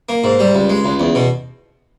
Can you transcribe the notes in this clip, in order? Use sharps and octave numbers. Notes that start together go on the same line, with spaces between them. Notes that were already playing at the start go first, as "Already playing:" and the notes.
A#3
G#2
G3
C#2
G#3
C#2
E2
B2